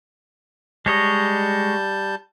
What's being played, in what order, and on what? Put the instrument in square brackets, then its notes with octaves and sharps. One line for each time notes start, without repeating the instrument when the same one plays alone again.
[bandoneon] G3 A5 G6 [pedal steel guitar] G#3 C#5 D#5